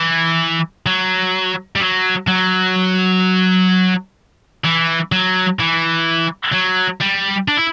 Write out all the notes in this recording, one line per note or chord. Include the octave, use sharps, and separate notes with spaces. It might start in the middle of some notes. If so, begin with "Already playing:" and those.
Already playing: E3
F#3
G3
F#3
F#3
E3
F#3
E3
F#3
G3
D4
E4